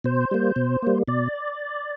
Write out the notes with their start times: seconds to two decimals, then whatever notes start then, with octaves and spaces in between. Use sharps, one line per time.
0.04 B2 C5
0.31 G3 A#3
0.56 B2
0.82 G3 A#3
1.08 B2 D5